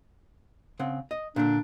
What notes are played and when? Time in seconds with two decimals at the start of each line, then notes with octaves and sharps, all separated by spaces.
0.79 C#3 C4 F#5
1.11 D#5
1.36 A#2 D3 D4